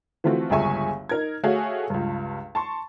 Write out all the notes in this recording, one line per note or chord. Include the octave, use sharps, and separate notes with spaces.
E3 F3 A3 C4 F4 F#4
G1 C#2 G#4 E5 G#5 C#6
D#4 A#4 G#6
A3 F#4 G#4 C#5 F5 G#5
C#2 G2
A5 C6 C#6